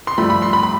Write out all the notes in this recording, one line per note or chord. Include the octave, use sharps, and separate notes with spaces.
C6
G2 F3 A3 B5
B5
C6
B5
B5